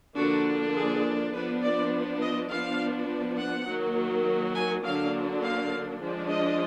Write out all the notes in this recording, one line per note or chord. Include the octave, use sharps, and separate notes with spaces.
D3 F3 A#3 D4 F#4
G#4
F3 B3 D4 B4
D5
D#5
F3 B3 D4 F5
F#5
D#3 F#3 A#3
G#5
D3 F#3 A#3 D4 F5
F5
F3 G#3 D4
D#5